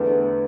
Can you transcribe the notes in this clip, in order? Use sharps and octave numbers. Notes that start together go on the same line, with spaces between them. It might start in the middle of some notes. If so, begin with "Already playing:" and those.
Already playing: E2 D3 A3 B4